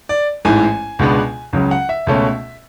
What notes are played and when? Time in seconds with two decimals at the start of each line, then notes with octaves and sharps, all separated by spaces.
0.09 D5
0.45 A1 G#2 E3 G#5
0.99 C#2 B2 G#3 B3 D4
1.53 C#2 C#3 F#3 C#4
1.71 F#5
1.89 E5
2.07 C#2 B2 A3 C#4